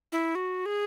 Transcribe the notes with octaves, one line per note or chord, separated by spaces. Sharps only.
E4
F#4
G#4